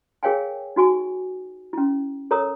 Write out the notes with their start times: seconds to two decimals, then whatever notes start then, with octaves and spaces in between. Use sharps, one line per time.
0.23 G#4 A#4 C#5 F5 G5 G#5
0.76 D#4 F#4 G#5 C#6
1.73 C#4 E4
2.31 A4 A#4 C#5 A#5 D#6